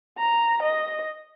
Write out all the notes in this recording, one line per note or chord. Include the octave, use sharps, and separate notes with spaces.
A#5
D#5